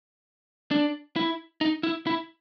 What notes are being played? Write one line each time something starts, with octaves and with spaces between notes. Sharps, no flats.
D4
E4
D#4
E4
E4